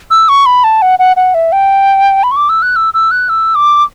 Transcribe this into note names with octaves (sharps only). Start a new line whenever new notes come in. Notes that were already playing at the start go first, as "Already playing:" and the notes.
E6
C#6
B5
A5
F#5
F#5
F#5
E5
G5
B5
C#6
D6
E6
F#6
E6
E6
F#6
E6
D6